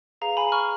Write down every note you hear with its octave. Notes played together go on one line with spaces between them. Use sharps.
G#4 B4 F5 A#5
G#5 B5
C#6 F6